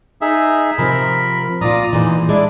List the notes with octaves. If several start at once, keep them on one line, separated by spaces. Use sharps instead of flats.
D#4 G#4 E5
C3 F3 A#4 B5
A#2 F4 D5 A#5 D#6
A#2 E3 G#3 D#4
G#3 D4 E4 D5